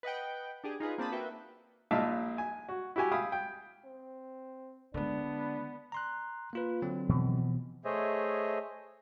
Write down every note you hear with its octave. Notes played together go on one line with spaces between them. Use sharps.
B4 D#5 F#5 G5
D4 G4 G#4
D#4 F4 G#4 B4
A#3 C4 D4 A5 B5 D#6
A#3 F#4 B4 E5 G5
A#1 A#2 D#4 E5 F5 A5
G#5
F#4
E4 F#4 G4 G#5
E5 F5 G5 G#5 B5 D#6
G5
C4
D3 G#3 B3 D4
A#5 C6 F#6
A#3 F4 B4
D3 F#3 C4
B2 E3 F3
A3 G#4 C5 C#5 D#5 E5